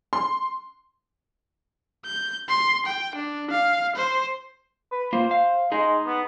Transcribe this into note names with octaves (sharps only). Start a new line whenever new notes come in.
C6
G6
C6
G5
D4
F5
C5
B4
A#3 F4 C5
F5
G#3 D#4 G#4
B3